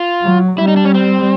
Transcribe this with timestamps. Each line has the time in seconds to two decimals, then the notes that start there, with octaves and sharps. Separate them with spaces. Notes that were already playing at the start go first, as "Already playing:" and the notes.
Already playing: F4
0.22 F#3
0.58 G3 E4
0.68 D#4
0.77 D4
0.85 C#4
0.95 C4